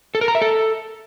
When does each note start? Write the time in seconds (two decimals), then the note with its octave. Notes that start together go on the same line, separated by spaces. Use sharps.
0.15 A4
0.21 A#4
0.28 A#5
0.35 E5
0.42 A4